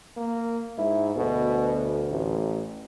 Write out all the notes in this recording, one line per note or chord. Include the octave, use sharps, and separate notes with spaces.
A#3
G#2 E4
D2 B2
A1